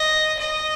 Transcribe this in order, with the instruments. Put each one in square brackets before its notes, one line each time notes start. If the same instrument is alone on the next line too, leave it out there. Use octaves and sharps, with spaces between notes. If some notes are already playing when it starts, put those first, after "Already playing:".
Already playing: [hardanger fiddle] D#5
D#5